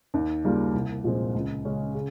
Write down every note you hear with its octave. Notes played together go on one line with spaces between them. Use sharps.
D#2
C#3 G3 A#3 F4
C2
A#2 F3 G#3 C4
C#2
C#3 G#3 C#4
C#3